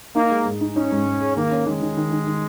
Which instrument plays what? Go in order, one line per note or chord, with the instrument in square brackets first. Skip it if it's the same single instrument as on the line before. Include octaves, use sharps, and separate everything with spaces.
[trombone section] A#3 [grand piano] D#4
[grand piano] G#3
G#2
D#4
[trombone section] C#4 [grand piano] D#4
[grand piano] G#2
G#2
G#4
[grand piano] D#3 [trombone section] A#3
[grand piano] C#4
[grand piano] D#3 [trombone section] G#3
[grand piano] D#3
D#3
D#3
D#3